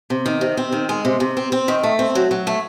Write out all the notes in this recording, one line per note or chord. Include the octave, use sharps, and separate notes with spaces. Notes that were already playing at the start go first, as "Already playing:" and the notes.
C3
D#3
C3
C4
D#3
G#3
C3
C3
C4
C4
D#3
A3
C4
F#3
F#3
A3